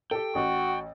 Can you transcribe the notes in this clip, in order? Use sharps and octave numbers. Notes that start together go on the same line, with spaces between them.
G4 A4 G5
A1 F#4